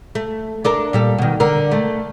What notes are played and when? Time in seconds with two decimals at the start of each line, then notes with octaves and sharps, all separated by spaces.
0.15 A3
0.64 D4 A4 A#4
0.93 A#2 G3 A4
1.18 B2 D#3
1.40 D3 A#4
1.72 A3